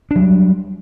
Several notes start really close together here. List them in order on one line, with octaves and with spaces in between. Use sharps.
D4 F#3 G3